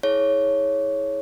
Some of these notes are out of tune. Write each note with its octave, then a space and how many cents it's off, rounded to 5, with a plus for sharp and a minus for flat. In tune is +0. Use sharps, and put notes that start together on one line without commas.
E4 -35 G#4 +30 C#5 +0